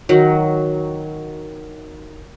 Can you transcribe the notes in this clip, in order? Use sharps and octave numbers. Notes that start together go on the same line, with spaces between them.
D#3 F#3